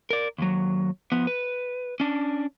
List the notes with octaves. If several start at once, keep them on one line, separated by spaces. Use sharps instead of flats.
A#4 D5
D#2 F#3
F3 B3
B4
C#4 D4